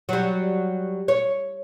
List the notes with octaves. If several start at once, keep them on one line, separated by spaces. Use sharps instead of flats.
F#3 G3
C#5